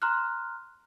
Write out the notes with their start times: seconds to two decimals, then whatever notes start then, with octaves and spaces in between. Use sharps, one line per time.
0.02 A#5 C6 F6 F#6